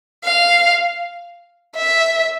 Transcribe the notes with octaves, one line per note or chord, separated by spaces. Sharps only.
F5
E5